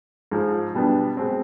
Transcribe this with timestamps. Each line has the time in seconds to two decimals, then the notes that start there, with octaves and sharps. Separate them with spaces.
0.32 G#2 F3 G#3
0.75 B2 G3 B3 D4
1.17 B2 G#3 C4